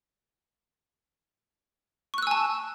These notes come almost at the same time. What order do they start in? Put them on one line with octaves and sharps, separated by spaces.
C#6 F#6 E6 G#5 A5